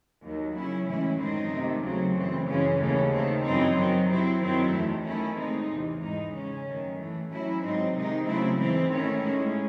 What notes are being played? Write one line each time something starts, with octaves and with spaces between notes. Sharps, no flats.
D#2 D#3 F#3
C#3 F#3 C#4 E4
A2 E3 G#3 C#4 E4
F#2 D#3 G#3 C4 D#4
C3 D#3 A3
D#2 C#3 F#3 A3 C4
F#2 E3 C4
C#3 E3 G#3 C#4
D#2 C#3 E3 A3 C#4
D#3 A3 C4
F#2 E3 C4 D#4
D#3 F#3 C4
C3 F#3 C4 E4
F#2 D#3 F#3 C4 E4
E2 D#3 A3
E2 D#3 A3 C#4 E4
A2 G#3 C4 D#4
E2 C3 E3
G#2 E3 G#3 D#4
C#3 G#3 C#4
F#2 D#3 A3
A2 E3 A3
A2 F#3 C#4 E4
G#2 F#3 C4 D#4
C3 D#3 G#3 D#4
C#3 F#3 A3 C4 E4
G#2 E3 G#3 C4 E4
D#3 A3 C#4 E4
A2 G#3 C#4